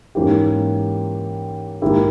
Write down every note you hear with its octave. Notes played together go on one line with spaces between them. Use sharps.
G#2 E3 A#3 C#4 G4
G#2 D#3 A#3 E4 G4